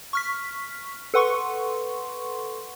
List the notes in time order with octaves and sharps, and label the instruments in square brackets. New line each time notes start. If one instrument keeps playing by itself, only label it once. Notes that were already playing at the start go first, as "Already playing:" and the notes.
[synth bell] C#6 F6 B6
A4 B4 F#5 C6 C#6